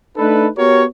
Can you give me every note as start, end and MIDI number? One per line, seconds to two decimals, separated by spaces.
0.17 0.48 57
0.17 0.48 62
0.17 0.48 63
0.17 0.48 69
0.17 0.48 71
0.57 0.84 59
0.57 0.84 66
0.57 0.84 67
0.57 0.84 70
0.57 0.84 73